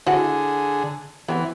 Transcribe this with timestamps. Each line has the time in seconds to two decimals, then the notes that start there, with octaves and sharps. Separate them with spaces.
0.07 D3 E4 F#4 G#4 F#5
1.28 E3 B3 C4